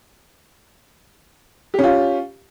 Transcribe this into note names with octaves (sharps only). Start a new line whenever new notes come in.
C#4 F4 G4